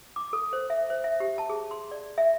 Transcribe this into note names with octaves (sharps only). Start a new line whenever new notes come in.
D6
A4
C5
E5
C5
E5
G4
A5
G#4
C6
D5
E5